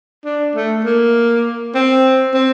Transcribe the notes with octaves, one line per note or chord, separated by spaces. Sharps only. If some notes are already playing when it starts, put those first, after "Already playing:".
D4
A3
A#3
C4
C4